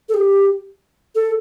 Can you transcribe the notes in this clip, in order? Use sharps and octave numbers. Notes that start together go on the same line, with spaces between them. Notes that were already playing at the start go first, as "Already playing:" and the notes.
A4
G4
A4